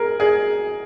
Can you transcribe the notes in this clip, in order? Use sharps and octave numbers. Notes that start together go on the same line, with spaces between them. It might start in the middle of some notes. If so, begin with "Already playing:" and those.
Already playing: G#4 A#4
G#4